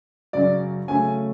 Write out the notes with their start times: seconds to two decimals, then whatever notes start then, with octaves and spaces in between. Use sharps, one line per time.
0.33 F#2 C#3 F#3 D5
0.88 C#3 F#3 A3 C#4 G#5